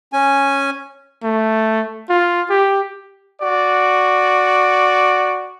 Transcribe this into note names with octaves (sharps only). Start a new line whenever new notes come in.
C#4 G#5
A3
F4
G4
F#4 D5